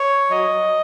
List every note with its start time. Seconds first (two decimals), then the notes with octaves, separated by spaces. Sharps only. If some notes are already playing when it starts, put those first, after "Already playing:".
Already playing: C#5
0.30 F#3 D#5